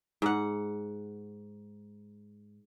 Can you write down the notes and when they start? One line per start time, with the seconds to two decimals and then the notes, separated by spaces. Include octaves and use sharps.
0.22 G#2 F#5